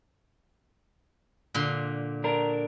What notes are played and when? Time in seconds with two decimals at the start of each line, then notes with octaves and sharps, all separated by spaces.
1.54 A#2 D3 C6
2.24 D4 A#4